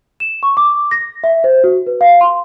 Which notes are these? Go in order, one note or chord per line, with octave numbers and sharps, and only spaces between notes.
E7
C#6
D6
A#6
E5
C5
F#4
B4
F5
C6